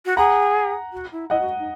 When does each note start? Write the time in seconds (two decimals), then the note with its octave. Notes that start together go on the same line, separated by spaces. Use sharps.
0.05 F#4
0.17 G#4 F#5 A#5
0.92 F#4
1.12 E4
1.30 E4 D#5 F#5
1.40 F#4
1.59 D#4